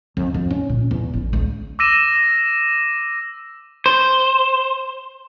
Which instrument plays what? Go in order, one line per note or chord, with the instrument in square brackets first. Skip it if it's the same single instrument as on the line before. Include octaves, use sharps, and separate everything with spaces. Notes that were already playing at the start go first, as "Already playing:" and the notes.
[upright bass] F2
F2
C#4
A#2
E2
A1
C#2
[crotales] D6 E6 A#6 D#7 E7
[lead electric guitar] C5